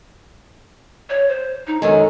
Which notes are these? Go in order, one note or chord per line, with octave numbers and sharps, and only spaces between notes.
C#5
C5
D#4
F#2 D#3 G#3 A4